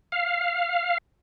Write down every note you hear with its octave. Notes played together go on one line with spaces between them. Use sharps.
F5